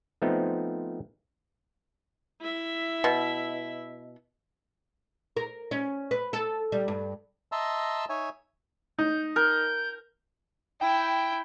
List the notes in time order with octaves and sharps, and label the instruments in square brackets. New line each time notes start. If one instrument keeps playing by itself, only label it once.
[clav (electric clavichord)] F3 A3 B3 C4 D#4
[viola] E4 E5
[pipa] B2
[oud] A#4
C#4
B4
A4
G3
G2
[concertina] D#5 E5 A5 A#5 C6 E6
D#4 C#5 E5 G#5
[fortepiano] D#4 [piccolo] G6
[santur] A#4 [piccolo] G6
[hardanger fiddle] E4 [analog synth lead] G5